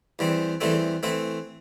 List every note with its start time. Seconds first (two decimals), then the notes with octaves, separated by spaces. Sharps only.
0.19 E2 E3 G3 C4
0.61 E2 E3 G3 A3 C4 A4
1.03 E3 A3 C4 E4 E5